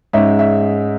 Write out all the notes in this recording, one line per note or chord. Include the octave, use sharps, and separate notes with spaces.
G#2 G#3 C#4 E5
E5